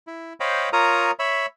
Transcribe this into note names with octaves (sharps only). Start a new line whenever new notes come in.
E4
C5 C#5 D#5 F5 G5 B5
F4 A#4 C#5 A#5 D#6
C#5 E5 B5